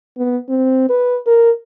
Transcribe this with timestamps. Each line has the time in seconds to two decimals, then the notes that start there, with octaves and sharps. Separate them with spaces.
0.18 B3
0.49 C4
0.89 B4
1.27 A#4